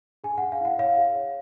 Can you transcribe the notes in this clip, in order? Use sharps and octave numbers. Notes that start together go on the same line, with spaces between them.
G#4 G#5
G#4 F#5
F5
E4 F#5
C#5 F5
G#4
C#5